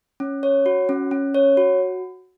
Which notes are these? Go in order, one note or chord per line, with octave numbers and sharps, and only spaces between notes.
C#4
C#5
F#4
C#4
C#4
C#5
F#4